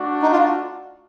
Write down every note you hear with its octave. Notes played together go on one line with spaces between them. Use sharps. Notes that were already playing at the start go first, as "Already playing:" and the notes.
Already playing: A3 D4 F#4
D#4
F4